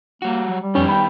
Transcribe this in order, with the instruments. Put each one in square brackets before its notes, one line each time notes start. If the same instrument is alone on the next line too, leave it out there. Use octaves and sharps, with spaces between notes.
[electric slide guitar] G3 F#4 [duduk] A#3
[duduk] F#3
G3
[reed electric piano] F2 C#4 [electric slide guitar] D#3 B3 G4
[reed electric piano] G5 B5